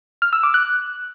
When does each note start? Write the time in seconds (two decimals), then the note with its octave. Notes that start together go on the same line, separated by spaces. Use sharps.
0.22 F6
0.33 E6
0.43 D6
0.54 F#6